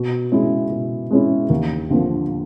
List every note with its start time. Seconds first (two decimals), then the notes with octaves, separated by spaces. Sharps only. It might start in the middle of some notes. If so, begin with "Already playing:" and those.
Already playing: B2
0.32 G#3 C#4 E4
0.71 B2
1.11 G#3 C#4 E4
1.50 D#2
1.90 D3 F3 A#3